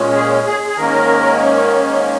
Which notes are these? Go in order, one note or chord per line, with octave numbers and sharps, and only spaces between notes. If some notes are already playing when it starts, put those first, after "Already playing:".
Already playing: A#2 G#3 C#4
G#4
G#4
G#4
G#2 D#3 A#3 C#4 A#4